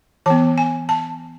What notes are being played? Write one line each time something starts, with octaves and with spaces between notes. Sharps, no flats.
E3 B3 A5
G#5
A5